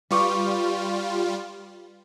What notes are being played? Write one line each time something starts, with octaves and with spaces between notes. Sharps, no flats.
G3 F4 B4 C#6 D6